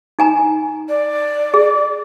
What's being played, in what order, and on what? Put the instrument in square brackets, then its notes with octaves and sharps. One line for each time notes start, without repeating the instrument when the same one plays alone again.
[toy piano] D#4 G#5 A#5
[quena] D5
[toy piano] G#4